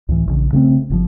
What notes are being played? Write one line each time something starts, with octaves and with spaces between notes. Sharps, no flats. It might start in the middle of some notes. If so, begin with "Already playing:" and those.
C#2 A2 E3
A#1 C#3
C#3 A3 B3 C4
G1 C#3 F3